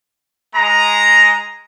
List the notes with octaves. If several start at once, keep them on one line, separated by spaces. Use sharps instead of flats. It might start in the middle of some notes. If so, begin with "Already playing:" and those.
G#3 A#5